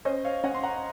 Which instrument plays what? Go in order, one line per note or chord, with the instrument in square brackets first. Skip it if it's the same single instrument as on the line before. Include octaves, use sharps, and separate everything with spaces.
[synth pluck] C#4 [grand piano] C5 D#5
[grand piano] C#5 F5
[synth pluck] C#4 [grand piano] D#5 F#5
[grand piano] C6
F#5 A#5